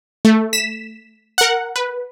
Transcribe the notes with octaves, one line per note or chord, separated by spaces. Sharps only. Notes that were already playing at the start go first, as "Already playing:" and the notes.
A3
B6 E7
A#4 F#5
B4